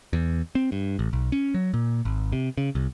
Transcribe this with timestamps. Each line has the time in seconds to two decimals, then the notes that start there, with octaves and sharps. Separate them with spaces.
0.13 E2
0.55 C4
0.72 G2
0.99 A1
1.13 B1
1.32 C#4
1.54 F#3
1.74 A#2
2.05 G#1
2.32 C3
2.57 C#3
2.75 C2